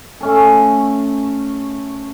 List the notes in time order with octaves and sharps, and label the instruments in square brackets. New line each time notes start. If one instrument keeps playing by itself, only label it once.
[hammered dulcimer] A3 C#4 A4